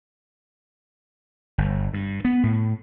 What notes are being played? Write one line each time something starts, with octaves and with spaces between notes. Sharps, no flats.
G1
G2
B3
A2